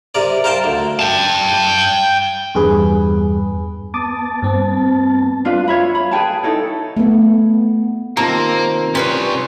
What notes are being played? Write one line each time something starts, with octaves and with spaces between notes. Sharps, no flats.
C3 A#4 D5
A#4 C5 F5 G5 A5
D2
G5 A5
E2 G2 G#4 B4
B3 A5 D6 D#6 A6
G2 C4
D4 F4 B4 F5
F4 C#5 E5 B5
B5
G#4 B4 G5 A5
D#4 E4 A4 C#5
A3 B3
C3 D#3 A#3 C4 F4 A5 A#5
C3 G3 C#4 B4 C#5 C6